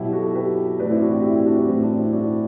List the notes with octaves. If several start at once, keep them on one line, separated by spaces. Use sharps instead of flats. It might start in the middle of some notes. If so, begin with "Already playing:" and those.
Already playing: B2 F#3 E4 G4
F#4 A4
G4 B4
A2 E3 B4 D5
C4 E4
D4 F#4
E4 G4
E4 G4
E4 G4
D4 F#4
C4 E4
A2 E3 C4
D4
C4 E4
D4 F#4